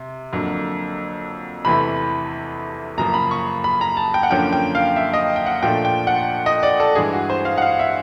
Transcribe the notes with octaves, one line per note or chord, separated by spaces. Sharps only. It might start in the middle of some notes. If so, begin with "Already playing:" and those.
Already playing: C3
F2 D3 F#3 A#3
E2 C3 E3 A3 B5
F#2 C#3 F3 A#3 A#5
B5
C#6
B5
A#5
A5
G5
F#5
F#2 D3 F3 A#3 C#4 G5
G5
F5
E5
D#5
G5
F#5
A#2 F3 A3 D4 G5
G5
F#5
D#5
D5
A4
G2 E3 G#3 G#4
F#4
C5
F5
F#5
F5
E5